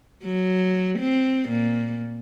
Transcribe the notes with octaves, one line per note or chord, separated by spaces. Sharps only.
F#3
C4
A#2